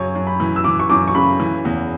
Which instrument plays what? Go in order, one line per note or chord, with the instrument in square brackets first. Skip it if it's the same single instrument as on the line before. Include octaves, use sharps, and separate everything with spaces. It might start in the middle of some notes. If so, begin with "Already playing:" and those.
Already playing: [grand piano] F#2 C#3 C#5
F#2
B5
E3
E6
E3 D6
C#6
F#2 D6
C#6
C#3 B5
E3
E2